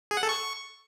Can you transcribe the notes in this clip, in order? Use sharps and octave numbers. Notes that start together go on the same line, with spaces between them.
G#4
F#5
A4
C#6